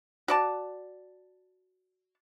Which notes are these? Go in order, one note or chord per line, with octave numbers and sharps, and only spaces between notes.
F#4 D5 A5